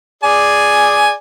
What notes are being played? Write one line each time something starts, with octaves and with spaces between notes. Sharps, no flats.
G#4 D5 G#5